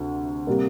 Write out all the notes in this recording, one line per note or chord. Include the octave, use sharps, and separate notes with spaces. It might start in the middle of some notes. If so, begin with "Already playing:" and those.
Already playing: D2 C3
C3 G3 A#3